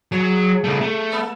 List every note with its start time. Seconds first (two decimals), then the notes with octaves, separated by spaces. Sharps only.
0.12 F#3 G#4
0.64 C#3 A3
0.81 A3
1.11 A#3 A4